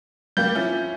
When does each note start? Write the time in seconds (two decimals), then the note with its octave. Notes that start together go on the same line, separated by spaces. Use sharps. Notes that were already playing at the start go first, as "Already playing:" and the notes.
0.37 G3 A#3 G4 G6
0.55 F3 C#4 E4